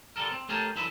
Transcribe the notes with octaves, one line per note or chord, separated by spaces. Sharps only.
D3 G3 A4 A#4
C4
A3 C#4 G4 G#4 A#4 A5
F#2 D3 E3 E4 E5 B5